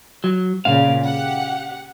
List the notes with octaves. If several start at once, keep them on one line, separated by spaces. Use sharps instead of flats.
F#3
A#2 C#3 F5
G4 F#5